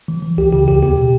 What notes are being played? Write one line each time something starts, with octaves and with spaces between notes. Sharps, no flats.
E3
E3
C#2 G4
C#3 G4
D#2 G4
B3 G4
B2